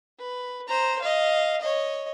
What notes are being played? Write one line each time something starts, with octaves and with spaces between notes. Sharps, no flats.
B4
C5 A#5
D#5 F5
C#5 D#5